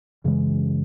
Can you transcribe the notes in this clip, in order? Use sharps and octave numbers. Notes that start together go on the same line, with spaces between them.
F#2 C#3 E3 G#3